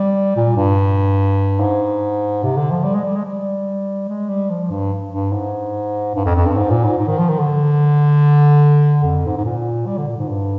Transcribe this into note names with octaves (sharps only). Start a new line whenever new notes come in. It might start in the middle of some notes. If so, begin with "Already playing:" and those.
Already playing: G3
A#2
G2
G#2
C3
D3
F3
G3
G#3
G3
G#3
G3
G#3
G3
F3
G2
G2
G#2
G2
F2
F2
G2
G#2
A#2
G#2
G#2
D#3
F3
D#3
D3
F2
G#2
G#2
A#2
G3
D3
A#2
G#2
G2